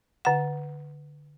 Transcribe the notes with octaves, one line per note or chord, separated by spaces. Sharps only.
D3 F#5